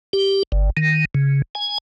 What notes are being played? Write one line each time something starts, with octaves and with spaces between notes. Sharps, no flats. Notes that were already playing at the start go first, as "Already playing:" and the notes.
G4
G1
D#3
C#3
G#5